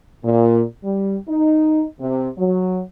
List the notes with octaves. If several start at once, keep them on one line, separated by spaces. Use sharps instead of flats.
A#2
G3
D#4
C3
F#3